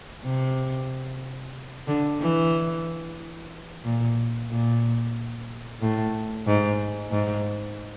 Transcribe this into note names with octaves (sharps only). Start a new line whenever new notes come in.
C3
D3
E3
A#2
A#2
A2
G#2
G#2